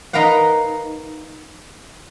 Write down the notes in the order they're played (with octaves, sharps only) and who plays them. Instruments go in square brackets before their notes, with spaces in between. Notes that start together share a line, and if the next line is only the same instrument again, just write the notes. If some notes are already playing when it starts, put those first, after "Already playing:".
[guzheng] D#4 A#4 B4 F5 F#5